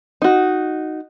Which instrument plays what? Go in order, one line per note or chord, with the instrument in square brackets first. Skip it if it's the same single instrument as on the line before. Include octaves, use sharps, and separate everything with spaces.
[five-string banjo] D#4 F#4